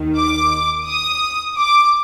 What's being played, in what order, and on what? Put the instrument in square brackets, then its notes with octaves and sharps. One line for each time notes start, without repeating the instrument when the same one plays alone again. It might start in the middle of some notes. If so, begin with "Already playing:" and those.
Already playing: [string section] D#2 D#3
D6
D#6
D6